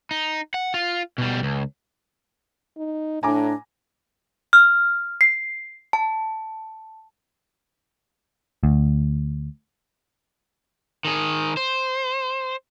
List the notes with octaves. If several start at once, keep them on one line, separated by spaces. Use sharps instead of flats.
D#4
F#5
F4
B2 G3
C#2
D#4
A2 D4 G#5 A#5 D6
F6
C7
A5
D2
D#3 G#4
C5